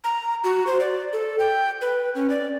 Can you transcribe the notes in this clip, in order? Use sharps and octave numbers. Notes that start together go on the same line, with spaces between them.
A#5
F#4
C5
D5
A4
G5
B4
C#4
D5